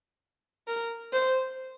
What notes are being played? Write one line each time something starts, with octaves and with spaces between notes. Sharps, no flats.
A#4
C5